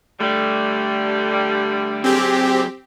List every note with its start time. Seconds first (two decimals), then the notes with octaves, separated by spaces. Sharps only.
0.20 D3 G3 A3
2.04 F#3 C4 G4 G#4